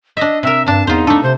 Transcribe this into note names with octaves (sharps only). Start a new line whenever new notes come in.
D4 D#5 E5
C3 A#4 E5
G2 C3 D4 A5
E2 D#4 F4 C5
A3 D4 A4
C3 C5